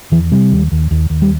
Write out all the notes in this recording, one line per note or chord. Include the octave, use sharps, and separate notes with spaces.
E2 E3
C3 G3
D#2
D#2
D#2
D#2
G3